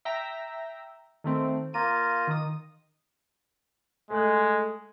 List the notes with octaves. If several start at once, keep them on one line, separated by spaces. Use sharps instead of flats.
E5 G5 A#5
D#3 A3 C4
A#3 F4 A#5 D#7
D#3 D#6
G#3 A3 F#6